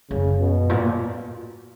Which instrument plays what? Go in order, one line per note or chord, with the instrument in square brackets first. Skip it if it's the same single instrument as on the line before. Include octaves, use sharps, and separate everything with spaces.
[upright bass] F#2 [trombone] C#3
[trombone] B2
[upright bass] A#2